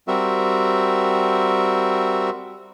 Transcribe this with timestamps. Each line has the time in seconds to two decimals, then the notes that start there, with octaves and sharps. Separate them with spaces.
0.08 G3 C4 F#4 A#4 E5